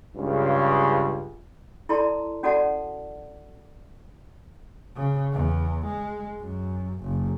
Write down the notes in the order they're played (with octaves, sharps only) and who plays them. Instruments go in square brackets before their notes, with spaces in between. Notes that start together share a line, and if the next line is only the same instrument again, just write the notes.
[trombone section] C#2 G2 C#3
[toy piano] E4 A4 D5 A5 A#5 C6
C#4 F#4 A4 D5 F#5 A5
[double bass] C#3
E2
G#3
F#2
F#1